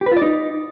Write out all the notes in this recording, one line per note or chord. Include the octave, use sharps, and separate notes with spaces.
G4
B4
F4
D5
D#4